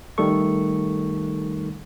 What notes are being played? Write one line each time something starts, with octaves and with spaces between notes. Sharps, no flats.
D#3 G3 A3 A4 C#6